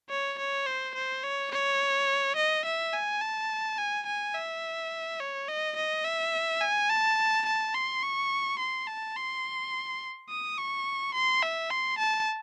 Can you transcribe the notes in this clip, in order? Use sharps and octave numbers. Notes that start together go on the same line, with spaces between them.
C#5
C#5
C5
C5
C#5
C#5
D#5
E5
G#5
A5
G#5
G#5
E5
C#5
D#5
D#5
E5
G#5
A5
A5
C6
C#6
C6
A5
C6
D#6
C#6
C6
E5
C6
A5